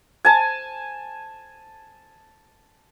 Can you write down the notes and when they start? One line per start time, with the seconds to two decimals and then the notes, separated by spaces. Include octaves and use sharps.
0.25 G#5 A5